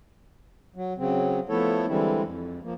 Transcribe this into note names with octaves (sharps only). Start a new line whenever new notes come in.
F#3
C#3 F#3 C4
F3 A3 B3 E4 A4 C#5
D3 E3 G3 G#3 C4 E4
F2
F3 A#3